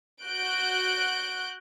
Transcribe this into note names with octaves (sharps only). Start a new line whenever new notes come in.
F#4 F#6 G6 D7